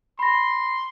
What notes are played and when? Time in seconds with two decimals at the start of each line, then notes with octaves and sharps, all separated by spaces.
0.19 B5 C6 A#6